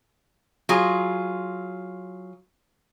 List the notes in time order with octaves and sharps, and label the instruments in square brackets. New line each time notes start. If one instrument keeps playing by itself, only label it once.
[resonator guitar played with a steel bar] F#3 F4 G#4